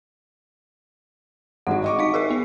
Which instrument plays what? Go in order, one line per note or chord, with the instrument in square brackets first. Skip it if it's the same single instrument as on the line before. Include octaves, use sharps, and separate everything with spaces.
[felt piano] G#1 F#4 [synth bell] F#5
[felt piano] D#5 C#6 D6
[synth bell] D#4 F5 B6
G#4 A#4 E5
B3